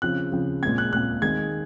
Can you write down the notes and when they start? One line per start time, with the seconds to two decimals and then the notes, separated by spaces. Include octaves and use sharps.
0.02 C#3 F3 C4 F#6
0.32 C#3 F3 C4
0.63 A#2 G#3 C4 G#6
0.78 F#6
0.93 A#2 G#3 C4 F#6
1.22 D#3 G#3 C4 G#6